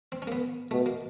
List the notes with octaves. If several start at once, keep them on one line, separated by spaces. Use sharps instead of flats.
C4
C#4
A#3
B3
B2 A3
A#3